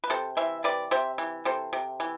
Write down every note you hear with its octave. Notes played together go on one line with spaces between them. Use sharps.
B4
C3 A4 C5
E3 C5 E5
C3 B4 D5
C3 C5 E5
E3
C3 A4 C5
C3
E3